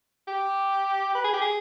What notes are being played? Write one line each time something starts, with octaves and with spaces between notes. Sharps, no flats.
G4
B4
G#4
G4
G#4